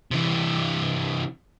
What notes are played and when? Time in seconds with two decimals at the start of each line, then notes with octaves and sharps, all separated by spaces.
0.12 C3 E3